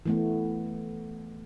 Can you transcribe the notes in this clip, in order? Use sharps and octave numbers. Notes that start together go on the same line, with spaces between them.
E3 A3 B3